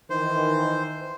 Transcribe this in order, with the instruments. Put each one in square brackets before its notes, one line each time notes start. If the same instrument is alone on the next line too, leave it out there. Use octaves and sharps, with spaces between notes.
[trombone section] D#3 E3 [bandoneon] C5